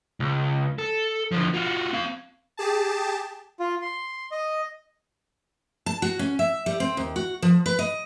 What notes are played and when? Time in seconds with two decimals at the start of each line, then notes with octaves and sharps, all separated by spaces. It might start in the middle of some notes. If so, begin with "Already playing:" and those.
0.20 C#2
0.78 A4
1.32 D3 F3
1.54 F4 F#4
1.93 C4 F5
2.57 G4 G#4 A5
3.60 F4
3.82 C6
4.31 D#5
5.86 A5
6.02 F#4
6.19 C#4
6.39 E5
6.66 G3
6.80 C4
6.97 D#2
7.16 F#4
7.42 F3
7.66 B4
7.79 D#5